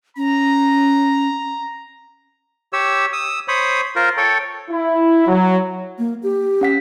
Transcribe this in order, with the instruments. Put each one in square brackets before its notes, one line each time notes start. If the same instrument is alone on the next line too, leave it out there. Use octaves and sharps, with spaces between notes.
[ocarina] C#4 [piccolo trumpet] A#5
[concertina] G4 C#5 E6
D#6 E6
C5 C#5 B5 D#6
F4 A#4 C5
A4 C#5 G5
[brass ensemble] E4
F#3
[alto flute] A#3
G4
[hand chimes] C#4 F#5 B6